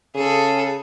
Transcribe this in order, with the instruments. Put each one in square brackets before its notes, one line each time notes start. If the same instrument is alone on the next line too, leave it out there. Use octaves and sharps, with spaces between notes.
[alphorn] C#3 [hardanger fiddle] G#4 A4